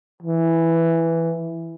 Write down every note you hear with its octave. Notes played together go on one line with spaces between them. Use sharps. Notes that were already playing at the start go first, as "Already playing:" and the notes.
E3